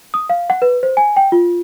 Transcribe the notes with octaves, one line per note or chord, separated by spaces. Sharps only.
D#6
F5
F#5
B4
C5
G#5
G5
F4